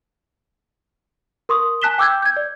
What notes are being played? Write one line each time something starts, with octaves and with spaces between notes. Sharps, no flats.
A#4 C6 C#6 D#6
G#5 A5 F#6 B6 E7 G7
G5 D6 E6 G6 G#6
G6 G#6
D5